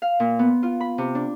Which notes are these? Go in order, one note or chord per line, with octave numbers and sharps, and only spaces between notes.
F5
A#2
B3
F4
B5
C3
D4